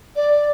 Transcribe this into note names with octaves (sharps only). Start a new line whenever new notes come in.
D5